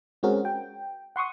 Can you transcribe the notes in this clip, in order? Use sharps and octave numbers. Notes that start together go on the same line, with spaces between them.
G#3 C4 C#4 F#4 G#4 A#4
G5
F#5 C6 C#6 D#6